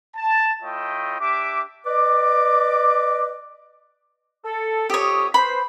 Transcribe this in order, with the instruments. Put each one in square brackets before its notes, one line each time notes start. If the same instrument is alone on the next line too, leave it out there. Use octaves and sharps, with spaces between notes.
[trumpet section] A5
A3 E4 F4 C#5 D#5 G5
D4 G4 E5 D6
[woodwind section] B4 D5 D#5 D6
A4
[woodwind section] F2 A4 D#6 [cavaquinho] G4 C#5
[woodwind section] B4 C5 [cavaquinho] B5